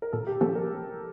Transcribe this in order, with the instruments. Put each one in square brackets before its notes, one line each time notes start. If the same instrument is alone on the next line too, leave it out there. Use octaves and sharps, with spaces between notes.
[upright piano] A#4
[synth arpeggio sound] A#2 [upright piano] A4
[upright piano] G4
[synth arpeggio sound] F3 A#3 C#4 G4 [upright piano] A4
[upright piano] A#4